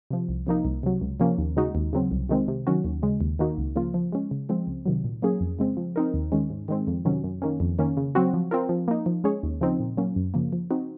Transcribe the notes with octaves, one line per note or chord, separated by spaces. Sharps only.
C3 F3
C2
C3 F3 A#3 D#4
C2
C3 F#3
C#2
C3 F3 A#3 C#4
D#2
C#3 G#3 D#4 F#4
D#2
C#3 F#3 C4
C2
C3 D#3 G#3 C4
C3
D#3 F#3 C#4 F#4
D#2
C#3 G#3
D#2
D#3 A#3 D#4 F#4
C#2
C#3 F3 A#3 F4
F3
G#3 C#4
C#3
F3 G#3 C4
C#2
C3 D#3 F#3
A#2
F#3 A#3 C#4 G#4
F2
C#3 G#3 C4
F3
C4 D#4 A#4
D#2
D#3 G#3 C#4
G#2
D#3 G#3 C4
F2
C3 D#3 F#3 C#4
F#2
D#3 A#3 C#4
F2
D#3 A#3 C#4
C#3
F#3 C4 F#4
F3
C4 F4 A#4
F3
A#3 D#4
F3
G#3 C#4 G#4 C#5
D#2
C#3 F3 C4 D#4
A#2
F#3 A#3 C#4
F#2
C#3 F3 A#3
F3
C4 D#4 F#4